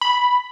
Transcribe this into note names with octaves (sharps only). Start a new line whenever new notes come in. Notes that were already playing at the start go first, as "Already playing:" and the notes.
B5